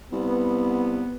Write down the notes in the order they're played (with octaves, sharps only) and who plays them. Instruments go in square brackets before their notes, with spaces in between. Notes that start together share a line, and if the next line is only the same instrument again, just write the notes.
[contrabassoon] C2 [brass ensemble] B3